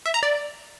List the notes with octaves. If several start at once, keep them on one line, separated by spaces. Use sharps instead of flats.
E5
A#5
D5